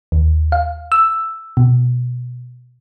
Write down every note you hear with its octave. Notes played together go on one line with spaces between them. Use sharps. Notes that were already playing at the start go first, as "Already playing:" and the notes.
D#2
F5
E6
B2